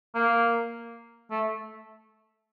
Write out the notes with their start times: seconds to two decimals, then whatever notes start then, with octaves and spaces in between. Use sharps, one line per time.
0.15 A#3
1.31 A3